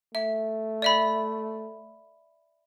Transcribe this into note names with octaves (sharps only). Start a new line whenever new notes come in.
A3 E5
D5 E5 B5